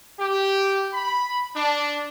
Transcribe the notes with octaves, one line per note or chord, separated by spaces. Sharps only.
G4
B5
D4